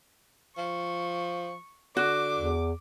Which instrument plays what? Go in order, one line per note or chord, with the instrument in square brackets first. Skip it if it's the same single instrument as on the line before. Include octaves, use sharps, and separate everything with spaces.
[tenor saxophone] F3 [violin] C#6
[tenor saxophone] D3 [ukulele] F#4 [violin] D6
[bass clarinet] E2